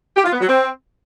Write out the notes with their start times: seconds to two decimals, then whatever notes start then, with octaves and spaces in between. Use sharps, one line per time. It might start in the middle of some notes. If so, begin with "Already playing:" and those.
0.16 G4
0.24 F4
0.33 B3
0.41 F#3
0.49 C4